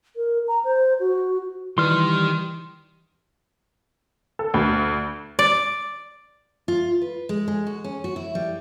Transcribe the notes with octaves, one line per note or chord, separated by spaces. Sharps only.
A#4
A#5
C5
F#4
D#3 E3 G3 C6 F6
A4
D2
D5
F4
B4
G#3
G#3
F#4
C#4
F#4
E4
G3